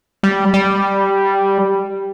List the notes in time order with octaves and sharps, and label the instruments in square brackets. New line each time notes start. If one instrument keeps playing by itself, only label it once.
[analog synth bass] G3
G3